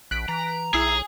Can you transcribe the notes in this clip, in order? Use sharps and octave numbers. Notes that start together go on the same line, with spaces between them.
A#1 F#6 B6 D7
E3 A#5
B1 E4 G#4 E6 C7